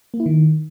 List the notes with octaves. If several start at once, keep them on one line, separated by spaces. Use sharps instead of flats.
A#3
E4
D#3